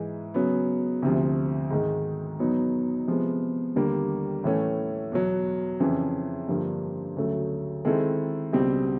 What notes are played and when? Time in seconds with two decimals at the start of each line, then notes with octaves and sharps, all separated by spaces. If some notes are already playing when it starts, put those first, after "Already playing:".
Already playing: G#2 E3 G#3
0.34 C#3 F#3 B3
1.02 D2 C3 F3
1.71 G#2 D#3 G#3
2.39 E2 B2 F#3 B3 D#4
3.07 C3 F3 G#3 B3
3.75 D#2 D3 G3 A#3
4.44 A2 E3 A3 C#4
5.12 E2 B2 F#3
5.80 F2 C#3 E3
6.48 G2 D3 F3 A#3
7.16 D2 C#3 F#3 A3
7.85 D#3 G#3 C4 E4 A4
8.53 C#2 B2 G3 C4